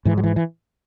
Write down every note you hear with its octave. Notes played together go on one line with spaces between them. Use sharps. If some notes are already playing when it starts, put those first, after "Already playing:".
G#2 E3
F#3
E3
E3